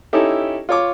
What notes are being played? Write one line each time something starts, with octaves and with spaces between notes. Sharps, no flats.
C#4 D#4 E4 G4 A4
F4 C#5 D6